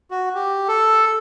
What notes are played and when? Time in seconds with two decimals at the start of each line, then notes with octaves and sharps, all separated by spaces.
0.11 F#4
0.35 G4
0.68 A4